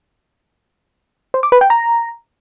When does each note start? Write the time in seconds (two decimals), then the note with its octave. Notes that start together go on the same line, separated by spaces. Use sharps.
1.34 C5
1.43 D6
1.52 B4
1.61 G5
1.70 A#5